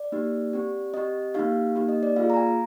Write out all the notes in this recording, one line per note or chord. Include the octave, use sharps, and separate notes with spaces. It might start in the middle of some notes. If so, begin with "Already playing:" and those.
Already playing: D5
A#3 D#4 G4
C4 G4
C4 G4 D#5
A#3 D#4 G4 F5
A#3 D#4 G4
D#5
D5
A#3 F4 G#4 F5
A#5
G#5